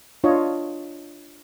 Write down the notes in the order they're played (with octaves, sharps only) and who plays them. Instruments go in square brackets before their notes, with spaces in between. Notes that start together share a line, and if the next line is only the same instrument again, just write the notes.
[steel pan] D4 F4 C#5 D#5